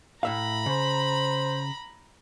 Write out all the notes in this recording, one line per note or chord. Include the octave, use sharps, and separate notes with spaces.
A2 E5 F5 A#5 B5
C#3 C5